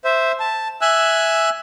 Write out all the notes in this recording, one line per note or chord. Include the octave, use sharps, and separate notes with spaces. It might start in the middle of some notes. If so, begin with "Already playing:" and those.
C5 E5
A5
E5 G#5 E6 F#6